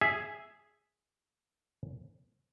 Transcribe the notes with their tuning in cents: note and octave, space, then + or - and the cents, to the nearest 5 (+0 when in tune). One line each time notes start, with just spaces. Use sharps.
G#4 +0 E5 +0